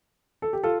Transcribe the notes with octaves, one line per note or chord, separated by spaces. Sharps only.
A4
G4
F4 A4